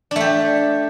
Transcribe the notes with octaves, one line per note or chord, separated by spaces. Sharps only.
A3 D4 G4